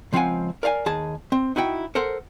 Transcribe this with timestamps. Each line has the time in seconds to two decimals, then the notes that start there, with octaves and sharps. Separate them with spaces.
0.13 C#2 F3 C4 F5 F#5 G#5
0.63 A#4 D5 F5 F#5 G#5
0.86 D#2 G#4 A5
1.32 C4
1.56 D#4 E4 F#4 G5
1.95 A4 A#4 C5 F#5